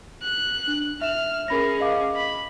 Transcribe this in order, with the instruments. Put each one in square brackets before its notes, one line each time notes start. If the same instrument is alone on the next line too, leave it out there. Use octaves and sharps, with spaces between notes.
[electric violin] F#6
[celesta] D4
[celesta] E5 E7 [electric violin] F6
[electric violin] C#4 G#4 [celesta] A#4 B5 A#6
[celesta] D#5 F5 D6
[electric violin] B5